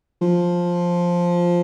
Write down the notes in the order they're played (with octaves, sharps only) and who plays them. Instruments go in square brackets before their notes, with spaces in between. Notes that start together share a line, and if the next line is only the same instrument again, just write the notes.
[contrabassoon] F3